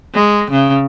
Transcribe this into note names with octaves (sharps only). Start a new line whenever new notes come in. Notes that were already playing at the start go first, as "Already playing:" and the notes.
G#3
C#3